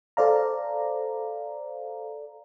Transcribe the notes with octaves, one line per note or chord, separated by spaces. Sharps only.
A4 C5 D5 F5 A#5